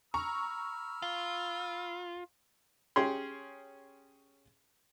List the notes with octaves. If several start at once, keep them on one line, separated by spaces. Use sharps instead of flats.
A#5 B5 C#6 E6 F6
F4
C#4 G4 G#4 C6